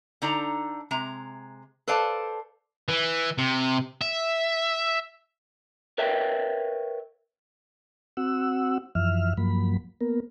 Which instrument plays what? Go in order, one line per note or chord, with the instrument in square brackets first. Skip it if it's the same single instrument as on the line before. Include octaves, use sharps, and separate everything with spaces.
[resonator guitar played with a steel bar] D3 D#4 D5 A#5
C3 G#3 A#5
A4 B4 C5 D5 F5 A5
[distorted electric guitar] E3
C3
E5
[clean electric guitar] A#4 B4 C#5 E5 F5 G5
[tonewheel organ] C4 F#4 F#5 E6
F#2 E3 F3 E5 F6
G2 F3 F#3 A#3 B5
A#3 B3 A#4